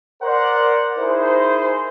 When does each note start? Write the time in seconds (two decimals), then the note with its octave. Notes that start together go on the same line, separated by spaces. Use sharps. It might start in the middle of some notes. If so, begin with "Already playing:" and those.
0.23 A#4 C5 D5 F#5
0.99 D#4 E4 G#4 A#4 C5